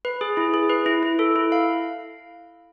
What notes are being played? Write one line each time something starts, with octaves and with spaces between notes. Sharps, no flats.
B4
G#4
E4
G#4
B4
E4
E4
A4
E4
F5